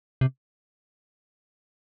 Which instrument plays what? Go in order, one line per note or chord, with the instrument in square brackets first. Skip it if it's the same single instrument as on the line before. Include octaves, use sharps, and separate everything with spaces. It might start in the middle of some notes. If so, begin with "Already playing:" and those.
[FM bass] C3